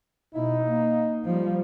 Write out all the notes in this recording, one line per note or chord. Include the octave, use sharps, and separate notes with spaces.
B2 D#4 E4
A#3
F3 G3